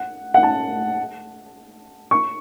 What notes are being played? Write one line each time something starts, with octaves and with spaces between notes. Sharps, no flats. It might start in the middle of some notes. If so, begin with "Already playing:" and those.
Already playing: F#5
F#5
A5
C#6